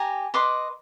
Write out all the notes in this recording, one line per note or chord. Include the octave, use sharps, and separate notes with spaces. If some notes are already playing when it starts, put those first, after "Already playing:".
Already playing: G4 G#5 A#5
B4 D#5 C6 D6